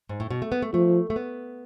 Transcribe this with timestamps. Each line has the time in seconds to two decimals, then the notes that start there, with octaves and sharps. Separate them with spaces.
0.09 G#2
0.20 A2
0.30 B2
0.42 A3
0.52 B3
0.62 A3
0.73 F3 A3
1.10 A3
1.16 B3